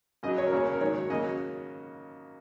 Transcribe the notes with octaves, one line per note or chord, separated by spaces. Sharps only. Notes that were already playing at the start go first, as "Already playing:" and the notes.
F#2 C#3 F#3 D#5
C#5
A#4
F#2 C#3 A#3 C#5
A#4
G#2 D#3 F#3 A#3 C#5
C#3 F#3 A#3 D#5